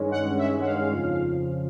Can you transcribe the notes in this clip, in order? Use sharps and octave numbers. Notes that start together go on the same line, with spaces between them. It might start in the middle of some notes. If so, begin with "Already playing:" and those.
Already playing: G2 D#3 G#3 C#4
F#5
E5
F#5
F5
F2 C#3 F3